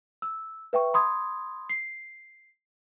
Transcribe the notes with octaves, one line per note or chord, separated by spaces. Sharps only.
E6
B4 E5 G5 C#6
B5 C6 D#6 G#6
C7